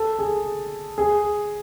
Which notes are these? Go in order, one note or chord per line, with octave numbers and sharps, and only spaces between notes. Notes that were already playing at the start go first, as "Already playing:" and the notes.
Already playing: A4
G#4
G#4